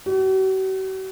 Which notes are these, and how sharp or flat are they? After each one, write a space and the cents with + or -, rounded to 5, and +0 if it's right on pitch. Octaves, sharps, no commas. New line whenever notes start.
F#4 +45